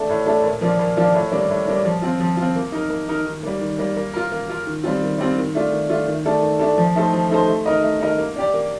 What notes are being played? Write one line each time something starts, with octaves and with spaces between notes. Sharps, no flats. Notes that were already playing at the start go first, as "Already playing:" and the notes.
Already playing: A3 D4 A4
A2
A3 D4 A4
A#2
F3 A#3 D4 F4
A#2
F3 A#3 D4 F4
A2
G3 A#3 D4
A2
G3 A#3 D4
F3
C4 F4
F3
F4
C4
A#3
D#4 A#4
A#3
D#4 A#4
D#3
G3 A#3
D#3
G3 A#3
A#3
F4 A#4
A#3
F4 A#4
D#3
G3 C4 F4
D#3
G3 C4 F4
D#3
A3 D4 F4
D#3
A3 D4 F4
D#3
A3 D4 A4
D#3
A3 D4 A4
F3
A3 D#4 A4 C5
F3
A3 D#4 A4 C5
A3
D#4 A#4 D#5
A3
D#4 A#4 D#5
A#3
D4 G4 D5
A#3